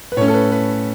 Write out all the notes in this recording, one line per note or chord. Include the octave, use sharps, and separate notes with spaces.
B4
A2 A3 C#4 C#5
A4
B4
B4